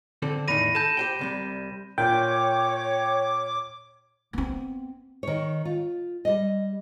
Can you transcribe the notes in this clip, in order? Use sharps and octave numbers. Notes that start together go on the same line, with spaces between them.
D3 C4 A4
E2 A2 D#3 B5 A#6 D#7
A4 A5 G6 E7
G4 C5 G5
C2 C3 G3
A#2 C#5 G5 D6
B3 C4
D#3 C#5
F4
G3 D#5